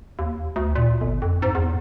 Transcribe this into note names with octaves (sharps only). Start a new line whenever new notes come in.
D#2
D2
A#2
G1
F2
G#2
E2